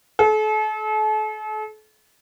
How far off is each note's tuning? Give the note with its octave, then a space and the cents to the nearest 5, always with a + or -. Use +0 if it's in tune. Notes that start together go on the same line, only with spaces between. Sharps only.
A4 -40